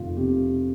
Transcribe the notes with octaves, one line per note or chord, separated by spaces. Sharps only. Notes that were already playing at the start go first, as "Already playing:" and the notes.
Already playing: F1 D#3 F4
C3 G4